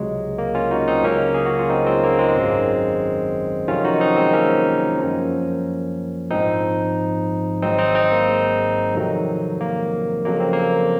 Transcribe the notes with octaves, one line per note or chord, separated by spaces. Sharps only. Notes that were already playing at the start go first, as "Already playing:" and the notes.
Already playing: C#2 C3 F#3 G#3
A#3
C#4 F4
D#4 F#4
C4 D#4
C#2 C#3 F#3 A#3 C#4
G#4
F#4
F4
C4 D#4
G#3 C4
A#3
G#3 C4
G#1 F#2 D#3 F#3
F2 C3 D#3 F#3 C#4 F4
D#4 F#4
C4 D#4
G#3 C4
A#3 C#4
F#2 F3
A#1 G#2 F3 C4 D#4
G#1 G#2 F#3 C4 D#4
C4 D#4
C4 D#4
A#3
G#3
F2 C3 D#3 F#3
A#3
F2 C#3 F#3 A#3
C4
A#3